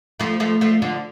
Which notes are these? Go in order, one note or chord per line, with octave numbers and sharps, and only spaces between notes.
F3 A3
F3 A3
F3 A3
D3 F3